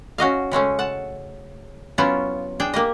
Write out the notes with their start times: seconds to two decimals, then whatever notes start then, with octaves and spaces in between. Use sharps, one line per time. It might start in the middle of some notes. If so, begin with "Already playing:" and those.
0.18 C#4 F#4 D#5 F5
0.51 C#3 G#3 A3 C#4
0.79 F#5 A5
1.98 F#3 B3 C#4 E4 F4
2.60 D4 G#4 G5
2.74 A#3 G4 D#5